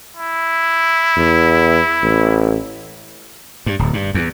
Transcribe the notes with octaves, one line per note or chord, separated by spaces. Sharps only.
E4
E2
A1
G2
D1
G2
E2